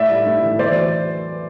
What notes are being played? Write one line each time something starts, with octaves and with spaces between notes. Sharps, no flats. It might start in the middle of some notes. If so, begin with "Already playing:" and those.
Already playing: A2 D5 E5
G3
A2
E3
E2 C5 D5
F#3